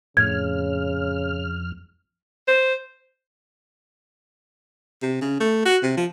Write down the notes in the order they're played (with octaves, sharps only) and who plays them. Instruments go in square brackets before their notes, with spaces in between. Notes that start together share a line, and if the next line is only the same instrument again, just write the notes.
[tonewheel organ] F2 F6 [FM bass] A2 [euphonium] C#3 [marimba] G#6
[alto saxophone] C5
[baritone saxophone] C3
C#3
A3
F#4
C3
F3